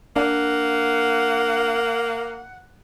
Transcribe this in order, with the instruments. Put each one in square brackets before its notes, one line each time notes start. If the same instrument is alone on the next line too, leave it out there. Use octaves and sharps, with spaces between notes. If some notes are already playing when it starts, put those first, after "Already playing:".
[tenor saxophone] A#3 [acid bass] D4 [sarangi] F#5